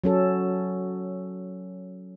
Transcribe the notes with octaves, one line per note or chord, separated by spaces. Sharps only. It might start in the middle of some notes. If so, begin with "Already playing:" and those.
F#3 C#4 A4